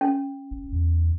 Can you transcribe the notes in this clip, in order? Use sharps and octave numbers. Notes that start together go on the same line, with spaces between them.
C#4
F#1
E2